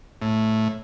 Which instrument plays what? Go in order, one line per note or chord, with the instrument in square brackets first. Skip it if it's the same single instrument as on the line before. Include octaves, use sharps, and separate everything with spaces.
[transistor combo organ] A2